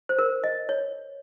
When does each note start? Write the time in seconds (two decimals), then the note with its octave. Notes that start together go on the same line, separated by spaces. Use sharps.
0.09 C5
0.19 A#4
0.44 D#5
0.69 C#5